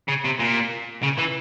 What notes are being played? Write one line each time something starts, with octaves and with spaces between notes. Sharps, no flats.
C#3
C3
A#2
C#3
E3